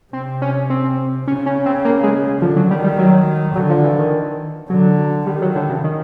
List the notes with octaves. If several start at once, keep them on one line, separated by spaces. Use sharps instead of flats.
C3 C4
C#4
C4
C#3 C#4
C#4
C4
A#3
G#3
D3 F3
F#3
D#3 G3
G3
F#3
D3 F#3
F3
E3
D#3
D3 F#3
D#3 G3
F#3
D3
C#3
D#3